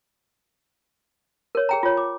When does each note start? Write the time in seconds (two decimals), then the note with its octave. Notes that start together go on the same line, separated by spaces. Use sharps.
1.55 A#4 C#5
1.69 G#4 G5 A#5
1.83 F4 C#5
1.97 D6